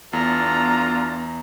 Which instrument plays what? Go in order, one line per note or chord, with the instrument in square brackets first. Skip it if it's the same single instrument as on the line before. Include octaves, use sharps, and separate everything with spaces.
[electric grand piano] E2 [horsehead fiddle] B3 A#5 [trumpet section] D4 F4 A4